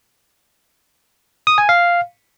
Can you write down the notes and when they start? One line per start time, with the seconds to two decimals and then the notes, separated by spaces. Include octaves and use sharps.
1.47 D#6
1.58 G#5
1.69 F5